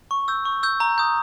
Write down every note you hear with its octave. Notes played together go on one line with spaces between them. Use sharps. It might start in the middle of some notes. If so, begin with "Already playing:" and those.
C#6
E6 G6
C#6
E6 G6
A#5
D#6 G6